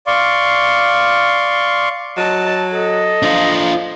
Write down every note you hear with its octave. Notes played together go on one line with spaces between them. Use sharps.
D5 F5 C6 C#6
F#3 D#5 A5
A4 D#5
F3 D4 F4